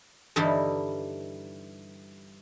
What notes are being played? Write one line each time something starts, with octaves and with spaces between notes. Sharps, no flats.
G2 D3 E3 G3 D#4 E4